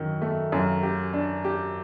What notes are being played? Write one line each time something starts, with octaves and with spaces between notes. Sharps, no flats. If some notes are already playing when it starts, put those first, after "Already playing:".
Already playing: F#2 D#3
A3
F#2
G4
D4
G4